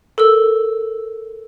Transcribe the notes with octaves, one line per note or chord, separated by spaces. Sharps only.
A4 A#4 E6